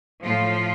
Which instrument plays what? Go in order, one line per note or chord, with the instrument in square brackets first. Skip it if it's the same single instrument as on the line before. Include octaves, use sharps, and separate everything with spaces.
[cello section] A2 F3 F4